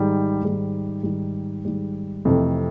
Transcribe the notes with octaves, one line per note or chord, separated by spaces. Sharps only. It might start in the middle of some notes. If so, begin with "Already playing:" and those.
Already playing: G#2 D#3 G3
G#2 D#3 G3
G#2 D#3 G3
G#2 D#3 G3
F2 C3 E3 A3